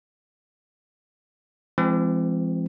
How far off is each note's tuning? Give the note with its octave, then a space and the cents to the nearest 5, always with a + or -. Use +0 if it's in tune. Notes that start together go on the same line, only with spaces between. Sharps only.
F3 -45 G#3 +0 C4 +0